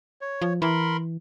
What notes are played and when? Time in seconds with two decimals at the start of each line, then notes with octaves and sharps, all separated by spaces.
0.21 C#5
0.42 F3
0.62 E3 A#4 B5 C6